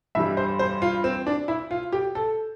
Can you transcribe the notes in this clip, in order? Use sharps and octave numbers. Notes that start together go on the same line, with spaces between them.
G2 E3 G3 E5
C5
C5
F4
C4
D4
E4
F4
G4
A4